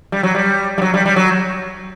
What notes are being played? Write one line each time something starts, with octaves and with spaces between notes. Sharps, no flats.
G3
F#3
G3
G3
F#3
G3
G3
F#3